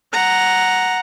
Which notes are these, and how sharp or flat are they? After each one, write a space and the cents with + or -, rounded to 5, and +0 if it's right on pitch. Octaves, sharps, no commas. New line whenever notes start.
F#5 +0 A#5 +0